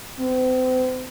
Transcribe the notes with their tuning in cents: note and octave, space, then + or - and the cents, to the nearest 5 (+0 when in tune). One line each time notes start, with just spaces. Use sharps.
C4 -35